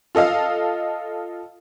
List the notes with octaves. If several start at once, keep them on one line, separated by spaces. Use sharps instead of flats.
F4 A4 D#5 F5